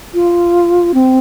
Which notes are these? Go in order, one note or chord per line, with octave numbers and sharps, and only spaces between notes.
F4
C4